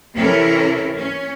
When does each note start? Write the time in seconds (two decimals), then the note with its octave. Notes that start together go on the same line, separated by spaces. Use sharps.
0.16 C3 E3 C#4 E4 A4 A#4
0.97 C#4